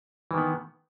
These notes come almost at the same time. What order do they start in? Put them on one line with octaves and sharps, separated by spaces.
E3 D#3 B3